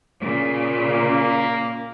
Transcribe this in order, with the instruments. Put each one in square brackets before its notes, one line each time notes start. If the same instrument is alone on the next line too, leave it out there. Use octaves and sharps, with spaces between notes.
[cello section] A#2 C#3
[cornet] A#3